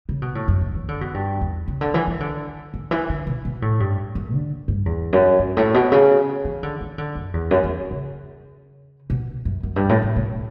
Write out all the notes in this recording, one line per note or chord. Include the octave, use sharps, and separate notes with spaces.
C#3
B2
A2
F#2
G2
E3
D3
B2
G2
E2
C#3
D3
E3
E3
D3
D3
E3
D3
B2
B2
A2
G2
F#2
D3
G2
E2
F#2
G2
A2
B2
C#3
E3
D3
E3
D3
F#2
E2
F#2
E2
C#3
B2
F#2
F#2
G2
A2
A2
B2